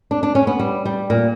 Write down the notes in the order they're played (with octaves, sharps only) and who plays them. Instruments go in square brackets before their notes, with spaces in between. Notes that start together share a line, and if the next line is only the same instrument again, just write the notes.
[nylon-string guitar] D4
D4
C#4
B3
G3
G3
A#2